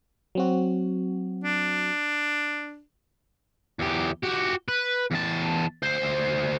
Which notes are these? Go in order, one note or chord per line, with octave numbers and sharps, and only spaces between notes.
F#3 C4 F#4
D4
E2 G4
F#4 G4
B4
E2 A5
D2 C5